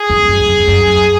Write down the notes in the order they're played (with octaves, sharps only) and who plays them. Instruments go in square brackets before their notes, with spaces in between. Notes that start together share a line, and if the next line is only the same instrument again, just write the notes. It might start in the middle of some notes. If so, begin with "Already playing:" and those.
Already playing: [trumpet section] G#4
[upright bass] F2
F#2
F2
F#2